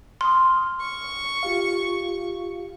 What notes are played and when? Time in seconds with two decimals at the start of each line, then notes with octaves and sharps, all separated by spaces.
0.21 C6 D#6 F6
0.80 C#6
1.43 F4 G4 F5